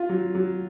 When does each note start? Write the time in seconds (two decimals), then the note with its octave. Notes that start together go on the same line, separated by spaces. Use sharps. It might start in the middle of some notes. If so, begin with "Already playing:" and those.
Already playing: F4
0.09 F#3
0.35 F#3